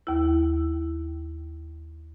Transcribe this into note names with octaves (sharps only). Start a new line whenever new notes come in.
D#2 E4